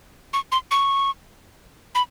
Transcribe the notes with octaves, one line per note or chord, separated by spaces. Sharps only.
C#6
C6
C#6
B5